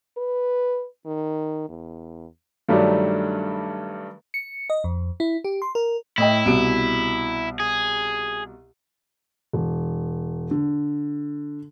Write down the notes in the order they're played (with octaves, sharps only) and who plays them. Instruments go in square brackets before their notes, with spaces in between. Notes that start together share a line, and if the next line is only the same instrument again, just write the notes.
[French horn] B4
D#3
E2
[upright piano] G2 D#3 F#3 G3 A3 D4
[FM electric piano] C#7
D#5
F2
E4
G4
C6
A#4
[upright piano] A2 D#5 G5 [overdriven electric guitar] E4
[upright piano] C2 B2 D7
[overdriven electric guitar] G#4
[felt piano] E1
D3